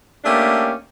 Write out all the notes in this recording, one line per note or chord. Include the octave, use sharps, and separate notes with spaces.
A3 A#3 C#4 D4 G4